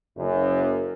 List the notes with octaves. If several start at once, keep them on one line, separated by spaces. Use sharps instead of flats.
F#1 F#2